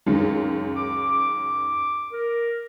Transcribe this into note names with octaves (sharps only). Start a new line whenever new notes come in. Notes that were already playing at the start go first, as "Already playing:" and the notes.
C#2 F#2 D#3
D6
A#4